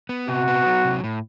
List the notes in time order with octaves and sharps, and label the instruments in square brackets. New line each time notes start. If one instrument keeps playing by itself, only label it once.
[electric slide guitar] B3
[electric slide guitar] C3 [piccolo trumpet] F#4
[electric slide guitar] B3
F#3
C3
A2